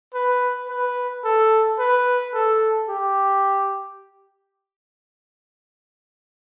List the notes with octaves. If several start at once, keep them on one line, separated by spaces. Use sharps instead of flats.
B4
B4
A4
B4
A4
G4